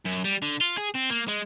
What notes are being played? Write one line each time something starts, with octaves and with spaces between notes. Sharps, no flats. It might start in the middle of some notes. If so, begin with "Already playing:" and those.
F#2
G3
D3
F4
G#4
C4
A#3
G#3